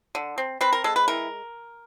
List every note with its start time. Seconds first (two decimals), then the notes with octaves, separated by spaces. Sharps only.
0.15 D3
0.38 C4
0.61 C4 B4
0.73 A#4
0.84 G#3 A4
0.96 B4
1.08 E3 A#4